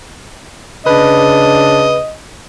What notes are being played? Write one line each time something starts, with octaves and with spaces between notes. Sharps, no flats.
C#3 D4 B4 D#5